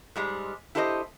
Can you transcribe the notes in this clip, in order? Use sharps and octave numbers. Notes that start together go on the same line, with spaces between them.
G#2 G3 G#3
E4 G4 A4 C5 D5 D#5